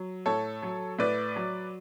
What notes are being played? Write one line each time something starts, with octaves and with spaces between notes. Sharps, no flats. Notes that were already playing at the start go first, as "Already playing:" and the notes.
Already playing: F#3
A2 A4 C#5
F#3
A2 B4 D5
F#3